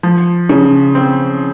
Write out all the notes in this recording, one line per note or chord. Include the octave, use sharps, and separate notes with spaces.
F3
C#3
C4